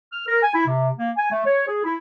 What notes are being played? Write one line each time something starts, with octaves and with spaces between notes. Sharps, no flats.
F6
A#4
G#5
E4
C3
A#3
G#5
A3
C#5
G#4
E4